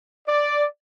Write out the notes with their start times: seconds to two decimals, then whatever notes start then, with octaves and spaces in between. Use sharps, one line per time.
0.27 D5